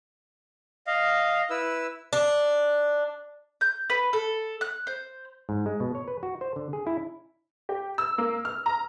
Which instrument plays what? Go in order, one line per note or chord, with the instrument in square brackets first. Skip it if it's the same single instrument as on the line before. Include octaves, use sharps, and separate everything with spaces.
[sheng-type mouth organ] D#5 F5
E4 B4 E6
[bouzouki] D4
[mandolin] G6
B4
A4
F#6
C5
[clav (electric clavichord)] G#2
G#3
B2
C#5
B4
F#4
C5
D3
G#4
E4
[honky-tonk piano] G4
E6
A#3
F6
A#5